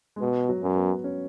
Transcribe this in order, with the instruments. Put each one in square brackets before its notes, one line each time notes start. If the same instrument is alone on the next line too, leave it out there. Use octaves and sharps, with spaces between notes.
[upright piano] G#3
[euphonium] B2 [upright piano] B3
[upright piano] F#3
[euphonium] F#2
[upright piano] B3
C#4